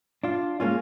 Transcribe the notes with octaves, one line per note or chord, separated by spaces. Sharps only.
D4 F4
G#3 A#3 C#4 F4